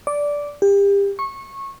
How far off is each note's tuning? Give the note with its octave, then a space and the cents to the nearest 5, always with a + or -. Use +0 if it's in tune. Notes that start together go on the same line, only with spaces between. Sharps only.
D5 -10
G4 +30
C#6 -20